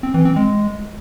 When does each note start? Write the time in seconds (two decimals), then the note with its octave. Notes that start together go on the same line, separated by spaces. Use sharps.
0.03 C4
0.14 E3
0.25 C4
0.36 G#3